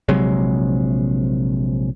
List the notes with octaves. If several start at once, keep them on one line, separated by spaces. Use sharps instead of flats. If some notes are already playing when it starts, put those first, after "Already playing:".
A#1 C3 F#3 G#3